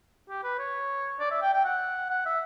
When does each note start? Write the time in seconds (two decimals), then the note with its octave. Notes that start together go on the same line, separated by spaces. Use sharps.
0.29 G4
0.43 B4
0.59 C#5
1.20 D5
1.31 E5
1.42 G5
1.53 G5
1.64 F#5
2.10 F#5
2.26 E5